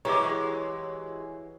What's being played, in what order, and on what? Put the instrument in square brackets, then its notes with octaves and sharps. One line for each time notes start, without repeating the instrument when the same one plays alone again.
[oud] E3 [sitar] F#3 G#3 G4 [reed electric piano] C#5 [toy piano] A#5 D6